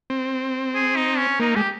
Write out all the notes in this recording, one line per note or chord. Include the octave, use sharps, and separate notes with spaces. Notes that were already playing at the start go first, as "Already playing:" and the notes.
C4
G#4
D#4
C#4
A#3 D#4
G#3 G4